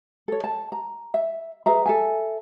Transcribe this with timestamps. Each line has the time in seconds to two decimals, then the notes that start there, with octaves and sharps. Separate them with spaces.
0.28 A4 C#5
0.44 A5
0.72 A#5
1.14 E5
1.66 G#4 B4 E5 A#5
1.86 A4 E5 G#5